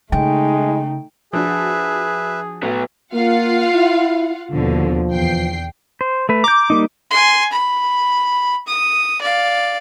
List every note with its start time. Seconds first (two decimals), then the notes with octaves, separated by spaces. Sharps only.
0.12 C#3 G#3 A3 D#4 G5
1.33 F3 D4 F#4 G#4 B4 E5
2.63 A2 F#3 B3
3.14 A#3 F4 F5 F#5
3.74 E4
4.54 D#2 B2 D3 F3
5.11 E2 G5 C7
6.01 C5
6.29 A3 B4
6.44 A#5 D6 G6
6.70 G3 A#3 D#4
7.11 G#5 C6
7.52 B5
8.67 D#6
9.22 D5 F5